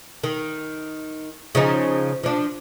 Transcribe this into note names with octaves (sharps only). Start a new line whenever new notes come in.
D#3
C#3 F3 D#4
F3 D4